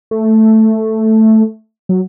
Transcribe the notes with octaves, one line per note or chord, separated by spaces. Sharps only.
A3
F#3